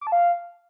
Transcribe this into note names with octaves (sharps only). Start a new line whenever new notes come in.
D6
A5
F5